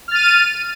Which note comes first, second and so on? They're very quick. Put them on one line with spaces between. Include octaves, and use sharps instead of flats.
F6 A6 D#7